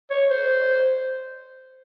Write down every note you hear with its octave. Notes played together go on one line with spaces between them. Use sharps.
C#5
C5